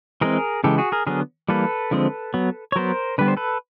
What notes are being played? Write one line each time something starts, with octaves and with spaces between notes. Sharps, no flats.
E3 G#3 C4 G#4 A#4
C#3 E3 G#3 G4 A4
F#4 G#4
G#4 A#4
D3 F#3 B3 G#4 A#4
E3 G3 A#3 A4 B4
D3 F3 G#3 C4
F#3 B3
C#5
F#3 B3 A#4 C5
D3 G3 B3 B4
C5
A4 B4